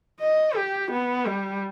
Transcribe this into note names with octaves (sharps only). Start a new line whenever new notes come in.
D#5
G4
B3
G3